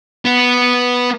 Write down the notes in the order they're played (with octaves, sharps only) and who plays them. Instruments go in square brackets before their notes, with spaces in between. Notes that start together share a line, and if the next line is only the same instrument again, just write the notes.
[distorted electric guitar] B3